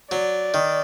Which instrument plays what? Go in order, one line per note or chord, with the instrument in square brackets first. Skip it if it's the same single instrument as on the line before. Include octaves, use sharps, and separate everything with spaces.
[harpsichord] F#3 [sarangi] D5
[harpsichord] D#3